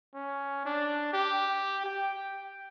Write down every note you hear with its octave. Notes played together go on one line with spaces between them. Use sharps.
C#4
D4
G4
G5